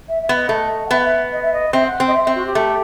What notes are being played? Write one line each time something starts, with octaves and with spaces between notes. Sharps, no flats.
E5
E5
B3
D#5
A3
F#5
B3 E5
F#5
E5
D#5
E5
D#5
C4 E5
F#5
C4
D#5
E5
C4 E5
F#4
G4
A3